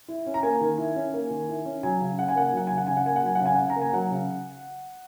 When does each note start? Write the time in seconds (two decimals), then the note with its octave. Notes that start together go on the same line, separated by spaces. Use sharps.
0.08 E4
0.26 C#4
0.34 A#5
0.43 A#3 G#5
0.61 D#3
0.78 E4
0.96 C#4
1.14 A#3
1.30 D#3
1.49 E4
1.65 C#4
1.83 F#3 G#5
2.01 C#3
2.18 C#3 F#5
2.28 G#5
2.36 A#3 F#5
2.47 G#5
2.53 F#3 F#5
2.67 C#3 G#5
2.77 F#5
2.87 C#3 G#5
2.97 F#5
3.05 A#3 G#5
3.16 F#5
3.23 F#3 G#5
3.35 F#5
3.41 C#3 G#5
3.55 C#3 F#5
3.70 A#5
3.76 A#3
3.81 G#5
3.93 F#3 F#5
4.11 C#3